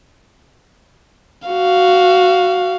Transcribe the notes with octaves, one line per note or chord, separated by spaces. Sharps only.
F#4 F5